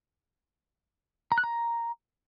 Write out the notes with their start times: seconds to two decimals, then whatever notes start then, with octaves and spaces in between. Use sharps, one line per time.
1.32 A#5
1.38 F#6
1.44 A#5